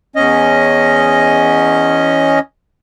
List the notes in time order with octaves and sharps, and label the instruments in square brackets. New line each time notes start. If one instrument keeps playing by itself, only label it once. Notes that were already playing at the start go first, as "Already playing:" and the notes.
[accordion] E2 C#4 D#5